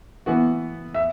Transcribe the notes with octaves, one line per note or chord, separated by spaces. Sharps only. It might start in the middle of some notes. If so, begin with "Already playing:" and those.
E3 B3 F#4
E5